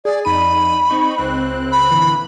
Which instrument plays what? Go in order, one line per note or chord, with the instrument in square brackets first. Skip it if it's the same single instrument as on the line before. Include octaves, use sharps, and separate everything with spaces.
[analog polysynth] G#4 [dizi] D5
[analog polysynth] F2 D#4 D#7 [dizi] B5
[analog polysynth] C4 D#4 C#6
C#2 C4 F#6
[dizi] B5
[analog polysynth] A#2 D3 E3